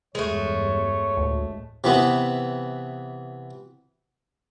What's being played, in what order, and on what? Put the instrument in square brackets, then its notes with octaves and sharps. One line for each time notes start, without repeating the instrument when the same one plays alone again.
[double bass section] A1 E2 G2 [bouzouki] G#3 A3 [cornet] C#5
[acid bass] D2 [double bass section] A2
[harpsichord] C3 E3 B3